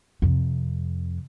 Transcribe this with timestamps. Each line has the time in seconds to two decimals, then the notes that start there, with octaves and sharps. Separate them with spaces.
0.22 F2 C3